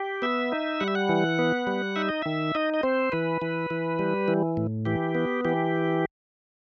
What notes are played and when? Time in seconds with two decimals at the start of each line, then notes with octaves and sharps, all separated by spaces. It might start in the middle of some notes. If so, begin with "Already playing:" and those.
Already playing: G4
0.22 B3 E5
0.52 D#4
0.80 G3 F#5
0.88 E5
0.95 F#5
1.09 E3
1.39 B3
1.67 G3
1.96 D#4 E5
2.09 D#5
2.22 D#3 E5
2.55 D#4 D#5
2.74 D#5
2.83 C4 C5
3.12 E3 B4
3.42 E3
3.70 E3
3.99 G3
4.28 E3
4.57 A2
4.85 E3 G4
5.15 B3
5.45 E3 G4